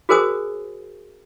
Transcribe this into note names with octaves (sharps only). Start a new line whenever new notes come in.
F#4 G#4 A#4 C5 G#5 D#6